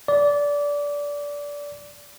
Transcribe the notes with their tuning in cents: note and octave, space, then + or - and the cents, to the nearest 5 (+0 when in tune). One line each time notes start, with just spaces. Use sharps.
D5 -20